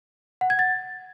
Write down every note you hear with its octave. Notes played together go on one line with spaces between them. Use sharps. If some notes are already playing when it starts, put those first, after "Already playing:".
F#5
G#6
A6